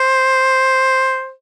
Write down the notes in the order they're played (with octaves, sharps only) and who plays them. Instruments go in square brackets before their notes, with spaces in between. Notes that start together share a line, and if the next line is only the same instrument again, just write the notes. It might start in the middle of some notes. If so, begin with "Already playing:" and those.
Already playing: [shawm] C5